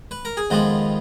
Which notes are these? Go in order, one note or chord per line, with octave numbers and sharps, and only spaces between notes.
B4
A#4
G#4
F2 D#3 G#3 B3 F4 F#4